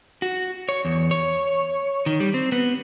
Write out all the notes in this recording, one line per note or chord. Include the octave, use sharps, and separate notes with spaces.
F#4
C#5
E2
C#5
D#3
G3
C4
B3